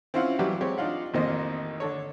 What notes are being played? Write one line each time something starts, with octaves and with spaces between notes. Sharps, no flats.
C4 C#4 E4 F4 F5 F#5
E3 F#3 G3 E4 F#4 G4
G#3 C4 G4 C#5
D4 D#4 F4 F5 F#5
A1 F2 D#3 A#3 C5 D#5
D3 D4 A4 C#5